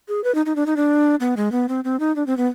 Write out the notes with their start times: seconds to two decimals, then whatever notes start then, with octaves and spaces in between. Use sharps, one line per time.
0.08 G#4
0.24 B4
0.35 D#4
0.46 D#4
0.56 D4
0.66 D#4
0.76 D4
1.20 B3
1.37 G#3
1.52 B3
1.69 C4
1.84 C4
2.00 D#4
2.16 D4
2.27 C4
2.37 B3